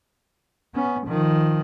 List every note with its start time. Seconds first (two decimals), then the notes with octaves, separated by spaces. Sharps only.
0.75 B3 C#4
1.07 D#3 F3